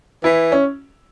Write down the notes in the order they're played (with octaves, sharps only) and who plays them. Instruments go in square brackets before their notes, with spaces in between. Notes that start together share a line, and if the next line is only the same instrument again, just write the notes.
[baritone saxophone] E3 [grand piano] E4
[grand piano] C#4